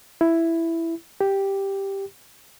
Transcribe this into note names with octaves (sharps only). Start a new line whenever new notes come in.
E4
G4